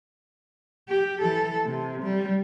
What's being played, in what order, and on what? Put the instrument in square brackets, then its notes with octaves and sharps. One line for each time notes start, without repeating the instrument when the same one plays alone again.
[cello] G4
E3 A4
C3
G3